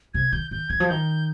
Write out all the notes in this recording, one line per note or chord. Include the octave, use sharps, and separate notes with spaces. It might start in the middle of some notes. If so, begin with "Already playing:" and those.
C3 G#6
D#3 G6
D#3 G6
D#3 G#6
F3
D#3 G6